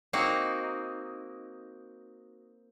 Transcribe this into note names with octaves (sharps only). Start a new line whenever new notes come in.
A#3 C4 D#4 F#4